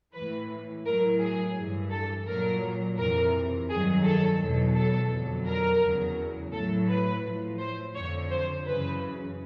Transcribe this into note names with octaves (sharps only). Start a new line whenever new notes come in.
A2 E3 B4
A2 F#3 A#4
G#4
G2 E3
A4
A#2 F#3 A#4
F2 C3 E3 A#4
G2 D#3 F#3 G#4
A4
E2 B2 F#3
A4
F2 D3 F#3
A#4
E2 C#3 F#3
A2 F#3 A4
B4
A2 F3
C5
F2 D3 F3 C#5
C5
F#2 C#3 E3 B4